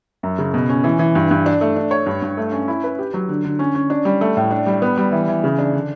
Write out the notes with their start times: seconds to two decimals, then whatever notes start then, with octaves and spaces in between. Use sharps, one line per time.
0.23 F#2
0.38 C#3
0.54 B2
0.69 C#4
0.84 E3
0.99 E3
1.15 G2
1.31 G2
1.46 D4
1.61 A3
1.76 D4
1.91 C#5
2.06 G2
2.22 G2
2.37 A3
2.52 C#4
2.68 E4
2.84 B4
2.99 G4
3.14 F#3
3.29 D3
3.45 D3
3.59 C#4
3.75 C#4
3.90 D4
4.05 G3
4.21 A3
4.37 A2
4.51 D4
4.66 G3
4.82 B3
4.97 G3
5.12 E3
5.28 E3
5.44 C#3
5.59 D4
5.73 D3